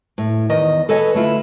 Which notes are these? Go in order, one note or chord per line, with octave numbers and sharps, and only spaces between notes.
A2
E2 D#3 D#5
A4 B4 C#5 D#5 G#5 A5
D3 A3 E4 F4